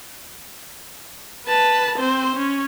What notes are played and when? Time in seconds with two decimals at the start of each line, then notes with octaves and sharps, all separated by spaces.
1.47 B4 A5
1.98 C4 C5
2.36 C#4